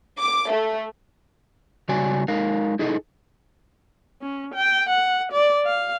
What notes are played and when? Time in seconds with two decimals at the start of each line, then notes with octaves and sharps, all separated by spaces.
0.20 D6
0.52 A3
1.89 C#3 G3 F#4 C#5 D5 G#5
2.28 G#3 D#4 A#4 F5
2.79 D#4 E4 G#4 A4 D#5
4.22 C#4
4.54 G5
4.89 F#5
5.32 D5
5.66 F5